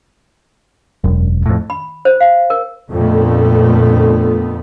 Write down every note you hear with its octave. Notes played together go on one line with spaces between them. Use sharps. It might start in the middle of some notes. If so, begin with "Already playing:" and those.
E1 F#2
F2 A2
B5
C5
F5
A#4
F2 A#2 D3 A3 B3